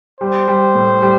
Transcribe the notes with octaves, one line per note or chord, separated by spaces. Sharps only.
G3 C5
G3
A2
G3